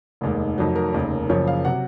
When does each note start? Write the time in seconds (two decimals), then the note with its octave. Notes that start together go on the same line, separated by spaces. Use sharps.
0.21 F1 D#2 D#3 G#3
0.58 F1 F2 D#3 F#3
0.76 A#4
0.93 F1 D#2 C#3
1.29 F#1 F#2 C#3 F3 C#5
1.48 F5
1.65 C3 F#3 F#5